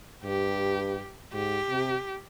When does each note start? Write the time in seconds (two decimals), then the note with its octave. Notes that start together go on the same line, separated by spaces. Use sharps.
0.23 G2 G4
1.33 G#2 G4
1.69 C3